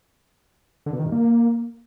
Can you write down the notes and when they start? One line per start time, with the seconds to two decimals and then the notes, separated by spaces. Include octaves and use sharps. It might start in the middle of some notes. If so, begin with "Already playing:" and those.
0.86 D3
0.93 B2
0.99 D#3
1.06 G2
1.12 A#3